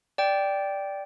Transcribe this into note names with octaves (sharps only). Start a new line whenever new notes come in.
D5 G5